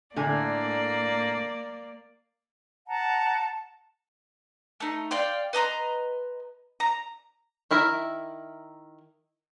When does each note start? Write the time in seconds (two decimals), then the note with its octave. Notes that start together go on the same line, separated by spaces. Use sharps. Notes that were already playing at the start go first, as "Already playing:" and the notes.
0.16 A2 D3 A#3 D5 G#5
2.87 F#5 A5 A#5
4.80 A3 D#4
5.11 D5 F5 G5 C6
5.53 B4 D#5 A#5 C6
6.80 A#5
7.71 D#3 E4 A#4 E5